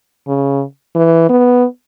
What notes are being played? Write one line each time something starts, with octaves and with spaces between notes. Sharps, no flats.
C#3
E3
B3